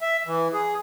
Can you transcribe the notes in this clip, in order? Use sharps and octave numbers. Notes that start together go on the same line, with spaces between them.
E5
E3
G#4